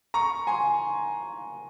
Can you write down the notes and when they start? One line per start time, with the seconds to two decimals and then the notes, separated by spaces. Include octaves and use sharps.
0.14 A#5 C#6
0.47 G#5 C6